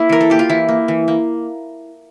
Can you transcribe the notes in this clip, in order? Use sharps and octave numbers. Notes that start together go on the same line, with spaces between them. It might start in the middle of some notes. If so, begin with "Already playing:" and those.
Already playing: A#3 E4
E3 A#4
A4
A#3 G4
F4
E3 E4
A#3
E3
A#3